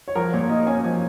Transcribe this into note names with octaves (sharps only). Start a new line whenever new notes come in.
C#5
F3 A#4
A#2 C#5
A#3 D#5
C#4 G#5
F3